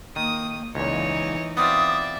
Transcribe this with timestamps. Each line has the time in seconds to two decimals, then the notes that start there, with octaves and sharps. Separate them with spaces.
0.16 D#3 A#3 D#6
0.75 C#2 A#2 E3 D#4 C#5
1.57 B3 C4 F4 D5 E5 D#6